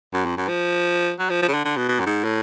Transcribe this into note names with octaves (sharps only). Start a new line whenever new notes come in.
F#2
F2
F#2
F3
F#3
F3
F3
C#3
D3
D3
B2
B2
F#2
G#2
A2